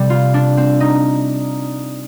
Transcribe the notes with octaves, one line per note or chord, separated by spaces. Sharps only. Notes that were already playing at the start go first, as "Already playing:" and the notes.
Already playing: C3 G3
F4
D4
C4
D#4